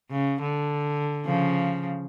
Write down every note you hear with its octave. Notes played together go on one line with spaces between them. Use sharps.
C#3
D3
C#3 F3